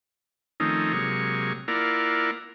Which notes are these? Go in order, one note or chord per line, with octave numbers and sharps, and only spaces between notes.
D#3 F3 A3 C4 C#4 D#4
C3 F#3 G#3 A#3 C#6
A#3 E4 F4 A#4 D5 F#5